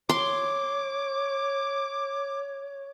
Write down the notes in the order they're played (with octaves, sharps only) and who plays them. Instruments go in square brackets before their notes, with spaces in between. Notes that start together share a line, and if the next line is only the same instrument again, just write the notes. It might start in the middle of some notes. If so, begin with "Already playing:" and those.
[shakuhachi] C#5 [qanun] C6 [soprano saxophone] D6